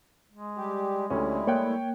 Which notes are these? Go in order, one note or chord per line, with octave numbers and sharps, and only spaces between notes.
G#3
G3 G4
D2 G3 A3 C#4 E4
A#3 C#5 G5 F#6